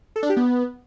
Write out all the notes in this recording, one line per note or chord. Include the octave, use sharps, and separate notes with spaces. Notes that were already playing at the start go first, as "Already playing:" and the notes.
A4
D4
G4
B3